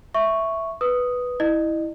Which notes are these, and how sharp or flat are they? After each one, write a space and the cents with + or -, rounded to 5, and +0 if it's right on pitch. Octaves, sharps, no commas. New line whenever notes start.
E5 +0 C#6 +0
B4 +0 D#6 +0
E4 -15 D#5 -35